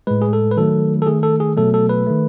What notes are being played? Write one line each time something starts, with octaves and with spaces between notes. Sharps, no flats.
A2 G#3 B4
G#4
A4
B4
D#3 F#3 A3 A4
A4
D#3 A3 G#4
A4
G#4
B2 F#3 A3 A4
A4
B4
D#3 A3